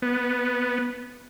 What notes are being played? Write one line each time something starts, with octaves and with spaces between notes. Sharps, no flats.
B3